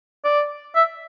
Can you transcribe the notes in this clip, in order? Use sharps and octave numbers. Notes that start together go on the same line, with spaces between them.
D5
E5